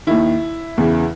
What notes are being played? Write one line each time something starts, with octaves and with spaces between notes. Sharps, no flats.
D#2 D#3 E4
E2 C#3 E3